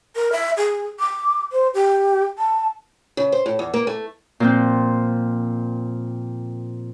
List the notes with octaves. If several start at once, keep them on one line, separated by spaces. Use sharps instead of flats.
A#4
E5
G#4
D6
C5
G4
A5
C#3
C5
A2
E2
A#3
A3
A#2 F3 C4